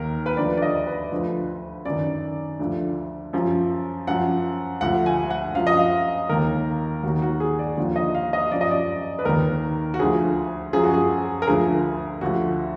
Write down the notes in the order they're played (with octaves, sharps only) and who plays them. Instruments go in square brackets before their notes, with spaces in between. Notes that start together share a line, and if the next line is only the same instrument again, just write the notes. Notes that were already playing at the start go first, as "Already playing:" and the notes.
Already playing: [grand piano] D#2 D#3 A#4
B4
D2 D3 F3 D5
D5
D#5
B4
D2 D3 F3
F#2 D#3 D5
D2 D3 F3
F#2 F3
F#2 F3 F#5
D2 D3 F3 F#5
G#5
F#5
F#2 F3 F5
D#5
F5
D#2 D#3 A#4
D#2 D#3 F#4
F#4
G#4
D5
D#2 D3 F3
D#5
F5
D#5
F#2 F3 D5
D#5
D5
B4
D#2 D#3 A#4
F#4
D2 D3 F3 G#4
F#2 F3 G#4
F#4
G#4
A#4
D2 D3 F3 G#4
D2 D3 F3 F#4